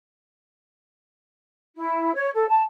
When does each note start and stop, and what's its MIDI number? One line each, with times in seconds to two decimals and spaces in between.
1.76 2.11 64
2.14 2.29 73
2.34 2.45 69
2.48 2.61 81